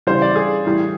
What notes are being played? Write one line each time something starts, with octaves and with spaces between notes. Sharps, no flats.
C#3 E3 G3 C5
D5
G#4
A2 E3 G3